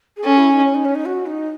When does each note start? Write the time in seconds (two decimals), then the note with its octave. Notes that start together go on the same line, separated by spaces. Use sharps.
0.17 G#4
0.24 C#4 A4
0.38 E4
0.52 D#4
0.65 C#4
0.75 D#4
0.85 C#4
0.95 D#4
1.06 F#4
1.26 D#4